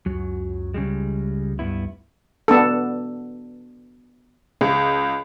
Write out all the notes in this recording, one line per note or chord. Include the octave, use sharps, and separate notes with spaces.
C#2 F#2 F#3
C#3 G3 G#3
G2 B3 E4
B3 D4 A4
C#2